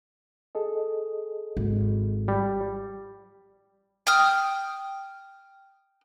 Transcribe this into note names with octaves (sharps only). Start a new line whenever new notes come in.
G#4 A4 D#5
G#1
G3
G5 D#6 F6